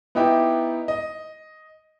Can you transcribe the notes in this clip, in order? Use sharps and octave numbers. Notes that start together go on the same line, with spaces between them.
B3 D#4 E4 G4
D#5